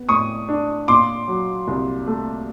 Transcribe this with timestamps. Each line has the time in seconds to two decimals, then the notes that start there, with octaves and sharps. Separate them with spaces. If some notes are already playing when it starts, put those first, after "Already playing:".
Already playing: B3
0.09 A2 C#6 D#6
0.49 D4
0.88 A#2 C6 D6
1.28 F#3
1.68 C2
2.07 A3